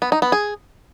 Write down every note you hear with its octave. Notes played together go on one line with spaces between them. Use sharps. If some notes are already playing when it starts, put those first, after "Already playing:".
B3
D#4
B3
G#4